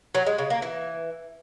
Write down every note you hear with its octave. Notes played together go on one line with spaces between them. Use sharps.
F#3
G#3
C#3
A#3
E3